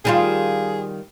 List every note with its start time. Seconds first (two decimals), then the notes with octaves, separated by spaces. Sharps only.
0.05 D#3 G3 F4 G#4